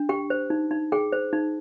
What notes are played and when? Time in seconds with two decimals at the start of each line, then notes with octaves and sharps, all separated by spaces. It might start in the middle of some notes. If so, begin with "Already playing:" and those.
Already playing: D4
0.09 G4 G5
0.30 C5
0.50 D#4
0.71 D#4
0.92 G#4 G5
1.12 C5
1.33 D#4